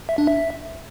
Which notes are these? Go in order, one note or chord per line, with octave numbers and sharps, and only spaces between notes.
E5
D4
E5